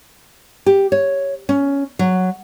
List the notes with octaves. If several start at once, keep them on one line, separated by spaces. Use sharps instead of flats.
G4
C#5
C#4
F#3